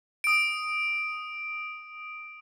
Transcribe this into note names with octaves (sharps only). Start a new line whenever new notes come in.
D#6 D7